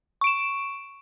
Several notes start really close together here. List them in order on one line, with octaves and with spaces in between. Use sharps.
C#6 D7 E7